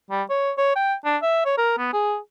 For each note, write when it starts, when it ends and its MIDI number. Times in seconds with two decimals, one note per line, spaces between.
0.11 0.23 55
0.30 0.51 73
0.58 0.75 73
0.75 0.94 79
1.05 1.17 62
1.22 1.41 76
1.45 1.53 73
1.58 1.73 70
1.78 1.91 59
1.93 2.17 68